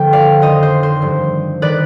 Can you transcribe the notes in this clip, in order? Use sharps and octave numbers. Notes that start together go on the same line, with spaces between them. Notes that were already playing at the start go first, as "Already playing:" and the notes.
Already playing: D3 F3 G5
D5 F5
F2 D#3 C5 D#5
C5
C5
G2 F3
D#3 B4 D5